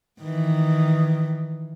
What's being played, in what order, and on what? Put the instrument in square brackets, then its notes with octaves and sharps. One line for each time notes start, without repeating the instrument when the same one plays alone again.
[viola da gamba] D#3 E3